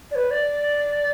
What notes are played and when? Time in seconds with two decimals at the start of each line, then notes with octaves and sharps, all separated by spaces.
0.11 D5
0.15 B4
0.31 D5